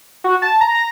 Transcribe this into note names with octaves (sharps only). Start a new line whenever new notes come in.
F#4
A5
A#5
A#5